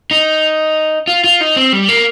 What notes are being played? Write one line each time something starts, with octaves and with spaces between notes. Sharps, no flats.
D#4
F4
F4
D#4
C4
G3
A#3